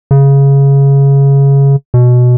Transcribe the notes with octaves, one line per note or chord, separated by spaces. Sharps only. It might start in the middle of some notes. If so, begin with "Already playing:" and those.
C#3
B2